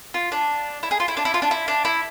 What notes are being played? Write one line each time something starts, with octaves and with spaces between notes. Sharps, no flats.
F4
D4
E4
G#4
F4
E4
D4
E4
F4
D4
E4
D4
E4